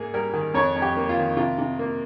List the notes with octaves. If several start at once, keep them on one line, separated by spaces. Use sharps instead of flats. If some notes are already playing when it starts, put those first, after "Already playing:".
Already playing: G#2 A#3 G#4
G3 A#4
D#3
F2 C#5
F2
G4
A#3
F4
D#3
C3 F4
C3
A#3